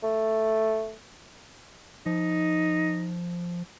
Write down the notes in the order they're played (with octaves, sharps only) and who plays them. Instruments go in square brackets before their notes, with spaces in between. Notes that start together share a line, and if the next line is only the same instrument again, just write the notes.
[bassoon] A3
[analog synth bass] F3 [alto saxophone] D#4